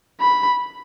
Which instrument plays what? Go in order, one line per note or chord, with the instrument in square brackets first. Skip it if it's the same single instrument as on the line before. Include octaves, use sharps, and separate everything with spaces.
[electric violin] B5